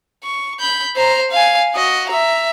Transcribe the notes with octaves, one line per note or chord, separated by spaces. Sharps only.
C#6
B5 G6
C5 A#5
F5 G#5
F#4 D#5
E5 A#5